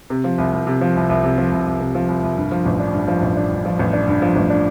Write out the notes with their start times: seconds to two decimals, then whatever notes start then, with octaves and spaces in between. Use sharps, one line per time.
0.10 C3
0.24 F3
0.38 C2
0.53 C2
0.67 C3
0.81 F3
0.96 C2
1.09 C2
1.24 C3
1.38 F3
1.52 C2
1.66 C2
1.80 C3
1.95 F3
2.08 C2
2.23 C2
2.37 G2
2.51 F3
2.66 A1
2.80 D4
2.94 G2
3.08 F3
3.22 A1
3.37 D4
3.51 G2
3.65 F3
3.79 A1
3.93 D4
4.08 G2
4.22 F3
4.36 A1
4.50 D4